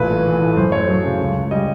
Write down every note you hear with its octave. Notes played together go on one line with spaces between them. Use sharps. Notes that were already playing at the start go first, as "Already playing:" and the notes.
Already playing: A1 A#2 B4
A3
E3
A2
F#2 C5
A3 C#5
F#3
C#3
C#2
C#2
G3 D#5